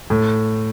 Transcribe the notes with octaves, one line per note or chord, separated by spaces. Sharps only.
A2